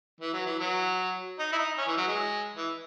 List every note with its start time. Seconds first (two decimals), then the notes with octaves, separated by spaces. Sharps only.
0.20 E3
0.33 F#3
0.46 E3
0.60 F#3
1.39 D#4
1.52 E4
1.58 D#4
1.78 C#4
1.87 E3
1.97 F#3
2.07 G#3
2.56 E3